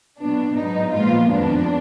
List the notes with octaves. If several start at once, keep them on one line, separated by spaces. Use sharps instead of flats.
B2 F#3 B3 D4
G#2 F#3 B3 D#4
A#2 F3 G#3 B3 F4
F2 D#3 G#3 B3 D4